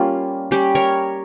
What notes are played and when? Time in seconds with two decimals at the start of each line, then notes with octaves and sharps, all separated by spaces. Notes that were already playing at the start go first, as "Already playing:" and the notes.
Already playing: G3 A#3 C#4 F4
0.51 G3 C#4 G4
0.75 A#4 C#5